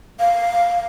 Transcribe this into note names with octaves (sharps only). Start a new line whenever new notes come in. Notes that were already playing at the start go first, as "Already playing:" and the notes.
F5